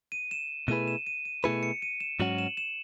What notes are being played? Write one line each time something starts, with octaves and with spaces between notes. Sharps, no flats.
D#7
E7
B2 A3 E4 G#4 B4 D#7
E7
D#7
D#7
B2 A3 E4 G#4 B4 C#7
C#7
D#7
E7
G#2 F#3 C#4 F#4 F#7
E7
E7